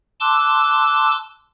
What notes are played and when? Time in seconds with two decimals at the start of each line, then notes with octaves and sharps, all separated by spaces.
0.20 A5 C6 D6 E6 F#6